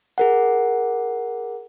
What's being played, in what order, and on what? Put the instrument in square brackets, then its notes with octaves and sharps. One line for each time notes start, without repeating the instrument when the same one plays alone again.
[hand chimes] G#4 A#4 F#5